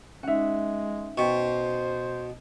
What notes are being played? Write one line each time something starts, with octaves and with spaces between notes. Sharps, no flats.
G#3 C#4 D#4 E5 F#5
B2 C5 G5 C#6